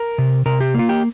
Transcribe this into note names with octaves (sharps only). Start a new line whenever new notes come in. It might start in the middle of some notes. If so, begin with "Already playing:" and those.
Already playing: A#4
C3
C3 A#4
G4
A#3 F4
G4